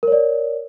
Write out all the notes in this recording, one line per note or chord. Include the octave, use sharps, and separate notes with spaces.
A#4 C#5 D5